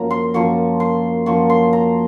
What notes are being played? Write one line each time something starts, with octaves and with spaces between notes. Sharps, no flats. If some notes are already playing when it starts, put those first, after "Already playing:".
Already playing: F#2 F3 A#3 A#5
C6
F#2 F3 A#3 C#6
C6
F#2 F3 A#3 C#6
C6
A#5